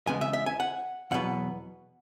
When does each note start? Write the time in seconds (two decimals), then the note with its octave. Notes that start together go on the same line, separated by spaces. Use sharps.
0.07 E2 C#3 G#3 B3 G#5
0.21 E5
0.33 E5
0.46 G#5
0.60 F#5
1.11 E2 B2 F#3 B3 F#5